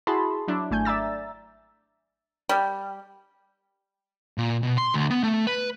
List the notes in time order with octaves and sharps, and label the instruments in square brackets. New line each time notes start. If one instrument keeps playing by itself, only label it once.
[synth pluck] E4 F#4 G#4 A5 B5 C6
F#3 D4 E4
G#1 A3 G#5 G6
D5 E5 A#5 E6 A6
[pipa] G3
[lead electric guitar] A#2
B2
C6
D2
B3
A3
B4